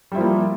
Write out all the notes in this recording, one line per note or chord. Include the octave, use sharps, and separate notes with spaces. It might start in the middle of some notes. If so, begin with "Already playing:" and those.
F3 G3 A#3 E4